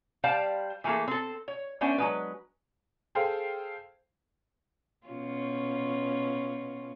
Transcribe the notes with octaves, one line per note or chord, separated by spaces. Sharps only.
G3 C5 D5 F5 A5
E3 A3 A#3 G#4 A4
C4 A4
C#5
A3 B3 C#4 D4 C5
F#3 G#3 B4
G#4 A4 C5 F5 G5
B2 C#4 F4